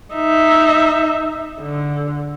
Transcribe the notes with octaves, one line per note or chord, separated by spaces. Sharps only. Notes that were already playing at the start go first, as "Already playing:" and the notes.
D#4 E5
D3